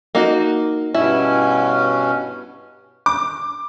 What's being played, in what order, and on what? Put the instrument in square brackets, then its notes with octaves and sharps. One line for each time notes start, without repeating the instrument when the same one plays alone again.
[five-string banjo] A#3 D#4 F#4
[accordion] G2 B2 C#4 [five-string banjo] E4
[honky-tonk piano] D6